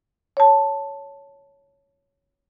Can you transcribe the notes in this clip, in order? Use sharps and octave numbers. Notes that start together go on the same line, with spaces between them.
C#5 A5